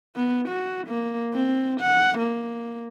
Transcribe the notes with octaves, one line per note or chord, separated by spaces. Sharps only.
B3
F#4
A#3
C4
F#5
A#3